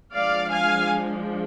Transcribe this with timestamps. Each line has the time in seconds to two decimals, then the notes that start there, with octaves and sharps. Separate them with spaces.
0.15 F3 G#3 D4 D5 F5
0.52 F5 G#5